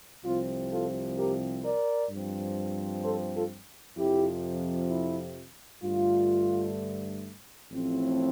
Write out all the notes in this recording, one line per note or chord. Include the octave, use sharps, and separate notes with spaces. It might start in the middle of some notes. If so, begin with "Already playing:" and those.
C2 C3 F3 C4 F4
F4 A4
G4 A#4
A#4 D5
G2 F3 C4
A4 C5
F4 A4
F2 C3 F3 E4 G4
E4
G2 D3 A3 F4
A1 A2 F3 C4